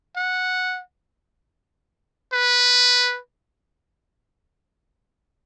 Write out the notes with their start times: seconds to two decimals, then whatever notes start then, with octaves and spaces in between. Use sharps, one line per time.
0.16 F#5
2.33 B4